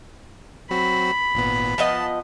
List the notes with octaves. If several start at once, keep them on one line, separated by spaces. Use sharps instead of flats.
F#3 C4 F#4 B5
G#1 A#2 B3
F3 B3 D#5 A5